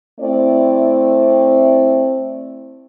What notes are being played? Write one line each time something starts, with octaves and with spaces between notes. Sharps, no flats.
A3 C4 E4 D5